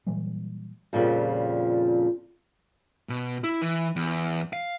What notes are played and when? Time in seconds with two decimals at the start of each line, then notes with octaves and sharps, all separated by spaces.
0.07 A#2 E3 F#3 G3
0.93 F2 A#2 C#3 F3 G3
3.09 B2
3.44 E4
3.62 E3
3.96 E2
4.53 F5